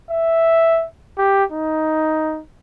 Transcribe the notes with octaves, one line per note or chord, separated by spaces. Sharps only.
E5
G4
D#4